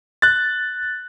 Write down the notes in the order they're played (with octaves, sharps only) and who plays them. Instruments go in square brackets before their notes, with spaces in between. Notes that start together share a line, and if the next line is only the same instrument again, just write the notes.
[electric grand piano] F#6 A6